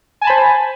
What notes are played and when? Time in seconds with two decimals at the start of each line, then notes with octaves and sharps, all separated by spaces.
0.21 G#5
0.24 A5
0.27 B5
0.30 C5